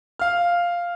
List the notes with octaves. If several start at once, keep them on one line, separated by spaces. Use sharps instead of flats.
F5 F6